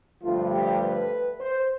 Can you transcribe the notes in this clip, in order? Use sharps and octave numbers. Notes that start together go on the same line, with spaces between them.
G2 D3 F3 A3 F4
G4
B4
C5